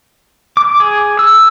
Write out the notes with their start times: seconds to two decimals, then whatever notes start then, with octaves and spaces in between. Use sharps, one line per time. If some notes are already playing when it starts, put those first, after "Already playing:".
0.57 D6
0.80 G#4
1.19 E6